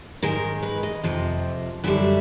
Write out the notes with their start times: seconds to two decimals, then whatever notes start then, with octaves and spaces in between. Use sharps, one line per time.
0.23 G#2 D#3 G#3 A#4
0.63 B4
0.83 D#5
1.03 F2 C3 F3
1.84 F#2 D3 G3 E5